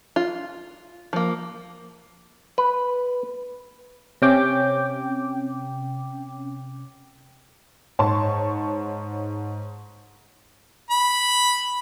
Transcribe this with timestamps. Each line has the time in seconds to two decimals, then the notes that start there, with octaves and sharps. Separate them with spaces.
0.16 F4
1.13 F3 A#3
2.58 B4
4.22 C3 C#4 G5 D6
7.99 G#2 C#5 A5 C6 C#6
10.90 B5